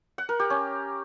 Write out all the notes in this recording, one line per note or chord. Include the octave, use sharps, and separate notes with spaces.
F#5
A#4
G4
C#4